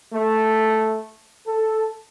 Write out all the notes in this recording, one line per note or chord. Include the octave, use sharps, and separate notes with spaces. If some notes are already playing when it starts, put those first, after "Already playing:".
A3
A4